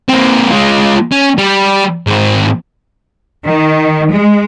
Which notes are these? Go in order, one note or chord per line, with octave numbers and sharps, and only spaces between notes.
A#3 C4
G#3 F4
C#4
G3
G#2 C4
D#3
G#3